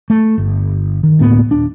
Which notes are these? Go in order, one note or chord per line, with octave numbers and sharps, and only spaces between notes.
A3
G1
D#3
D2 A2 A#3 B3
D#1 D4